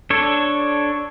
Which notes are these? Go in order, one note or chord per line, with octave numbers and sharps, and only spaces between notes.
D4 A4 C#5